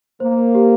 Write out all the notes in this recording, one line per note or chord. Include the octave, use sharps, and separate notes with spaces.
A#3 C5
G4